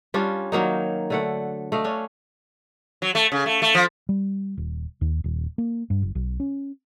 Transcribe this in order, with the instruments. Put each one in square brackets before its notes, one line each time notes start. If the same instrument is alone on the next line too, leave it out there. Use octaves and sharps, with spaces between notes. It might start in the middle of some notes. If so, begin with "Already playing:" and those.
[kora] G3 C#4 D4 F4
D#3 F#3 A#3 D#4
D3 A3 F#5
A3 D#5 F5
C#4 D4
[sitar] F#3
A3
C#3
A3
A3
F3
[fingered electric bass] G3
D#1
D#2
D#1
A#3
G2
F#1
B1
C#4